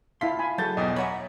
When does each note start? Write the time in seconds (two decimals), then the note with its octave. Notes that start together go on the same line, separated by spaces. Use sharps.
0.21 E4 F4 F5 A5 C6 B6
0.39 G#5 B5
0.58 F#3 G#4 A4 G6 A6
0.77 B1 E2 D#5 G5 D#6
0.96 C#5 E5 F#5 G#5 A#5 B5